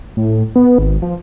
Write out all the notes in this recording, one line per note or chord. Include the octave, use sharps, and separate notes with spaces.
A2
B3
G#1
F3